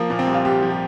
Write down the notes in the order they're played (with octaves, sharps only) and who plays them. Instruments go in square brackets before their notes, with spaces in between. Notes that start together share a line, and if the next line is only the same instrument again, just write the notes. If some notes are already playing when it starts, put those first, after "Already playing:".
Already playing: [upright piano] F3 A#3
A#2 A#3
C4
C2
F4
C2 G4
F3
G4